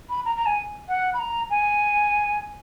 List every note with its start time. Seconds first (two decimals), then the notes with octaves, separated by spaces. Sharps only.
0.09 B5
0.25 A#5
0.36 A#5
0.46 G#5
0.88 F#5
1.13 B5
1.19 A#5
1.50 G#5